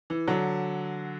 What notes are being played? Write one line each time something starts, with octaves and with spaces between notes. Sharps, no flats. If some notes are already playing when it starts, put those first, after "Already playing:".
E3
D3 F#3